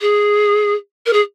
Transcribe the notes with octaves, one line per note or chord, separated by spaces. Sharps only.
G#4
A#4
G#4